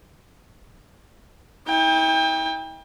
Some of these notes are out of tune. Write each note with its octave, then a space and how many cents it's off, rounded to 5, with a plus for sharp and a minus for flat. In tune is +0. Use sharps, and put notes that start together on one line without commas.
E4 -45 G5 +30